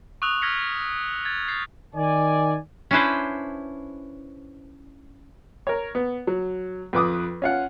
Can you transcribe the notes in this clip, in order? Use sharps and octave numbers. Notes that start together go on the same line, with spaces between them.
C#6 D#6 E6 F#6 F7
F6 G#6 A#6 B6 C#7 F7
G#6 A6
G6 A6 C7
D#3 D5 G#5
C#4 D4 E4 B4 C5
A#4 C#5
B3
F#3
F2 B4 D6 D#6
C#4 F4 F#5